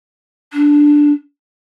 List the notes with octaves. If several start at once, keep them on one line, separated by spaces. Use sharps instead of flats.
D4